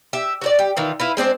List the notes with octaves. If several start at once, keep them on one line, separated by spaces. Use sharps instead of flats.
G4 E5
F#4 G4 D5
G4
D#3 E3 F4
E4 F4 B4
G#3 C4 D4 C5